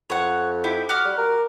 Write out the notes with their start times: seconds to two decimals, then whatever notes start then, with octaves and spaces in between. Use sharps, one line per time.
0.10 F2 C#5 F#5
0.64 D#4 E4 G4
0.89 F#4 D6 F6
1.05 G3
1.17 A#4